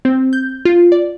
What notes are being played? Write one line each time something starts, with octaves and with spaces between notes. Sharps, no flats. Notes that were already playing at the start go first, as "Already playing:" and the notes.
C4
G6
F4
D5